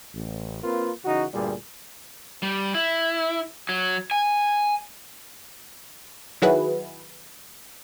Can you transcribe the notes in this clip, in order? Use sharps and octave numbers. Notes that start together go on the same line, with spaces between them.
A1
A#3 C4 F4 A#4 B4
C#3 E3 D#4 F#4
D2 G2 A#2 G3 G#4
G3
E4
F#3
G#5
D#3 F#3 E4 F#4 G#4 B4